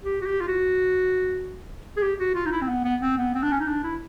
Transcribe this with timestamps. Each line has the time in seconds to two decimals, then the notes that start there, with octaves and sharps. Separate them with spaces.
0.04 G4
0.21 F#4
0.26 G4
0.41 F4
0.48 F#4
1.97 G#4
2.02 G4
2.20 F#4
2.35 F4
2.46 D#4
2.52 E4
2.62 C4
2.69 B3
2.85 B3
3.02 C4
3.18 B3
3.35 C4
3.43 D4
3.52 C#4
3.60 D#4
3.68 D4
3.84 E4